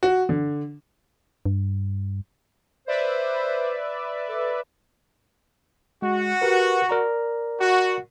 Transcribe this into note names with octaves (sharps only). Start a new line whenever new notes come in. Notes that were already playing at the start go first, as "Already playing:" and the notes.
F#4
D3
G2
B4 C5 D5 E5
A4
G#3 F#4
G4 A#4 B4
A#4 D5 A#5
F#4